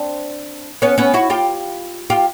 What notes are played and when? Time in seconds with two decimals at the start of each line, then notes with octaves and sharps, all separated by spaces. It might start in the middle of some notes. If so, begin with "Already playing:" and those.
Already playing: C4 D4
0.82 B3 C#4
0.98 B3 C#4
1.14 E4 F#4
1.30 F4 G4
2.10 F4 G4